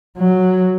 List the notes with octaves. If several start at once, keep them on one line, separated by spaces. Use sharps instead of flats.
F#3